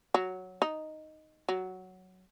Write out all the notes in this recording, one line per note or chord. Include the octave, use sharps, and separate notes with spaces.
F#3
D#4
F#3